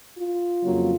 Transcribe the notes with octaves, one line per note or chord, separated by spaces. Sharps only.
F4
F2 C#3 F#3 A#3